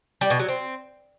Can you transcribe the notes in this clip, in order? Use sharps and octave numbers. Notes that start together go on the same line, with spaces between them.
G3
B2
F#3
C4